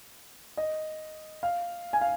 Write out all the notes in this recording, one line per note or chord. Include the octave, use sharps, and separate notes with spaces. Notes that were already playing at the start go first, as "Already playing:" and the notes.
D#5
F5
G#5
F5